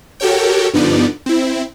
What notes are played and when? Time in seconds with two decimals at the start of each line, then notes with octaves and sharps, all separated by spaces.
0.20 F#4 G4 A4 A#4 C#5 G5
0.74 G2 D3 F3 B3 D#4 D5
1.26 C4 E4